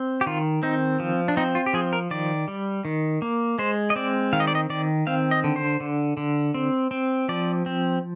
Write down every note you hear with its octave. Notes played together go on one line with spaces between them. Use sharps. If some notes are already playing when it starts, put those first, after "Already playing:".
Already playing: C4
G4
D#3 F4
C4 D#4
F3
D4
C4 D#4
F4
G4
F3 G#4
A#4
D#3 D5
G3
D#3
A#3
G#3 C5
D#5
C4 D5
D#3 F5
D#5
D5
D#5
D#3 D5
C4 F5
D#5
D3
C5
D3
D3
C4
C4
F3 D5
C4